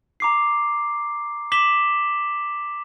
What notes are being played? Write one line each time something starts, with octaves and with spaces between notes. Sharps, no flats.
A#5 D6 C7
D6 B6 E7 F#7 G7